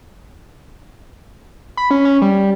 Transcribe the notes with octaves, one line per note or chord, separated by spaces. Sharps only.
B5
C#4
C#4
G3